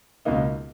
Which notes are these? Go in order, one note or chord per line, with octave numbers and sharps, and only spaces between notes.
C#2 B2 A#3 D#4